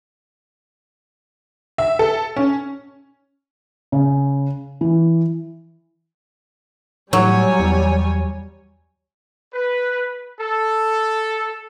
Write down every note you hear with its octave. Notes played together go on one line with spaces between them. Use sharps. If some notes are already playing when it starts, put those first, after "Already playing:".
E5
A4
C#4
C#3
E3
A2 F#3 G3 C#5 G#5
E2
B4
A4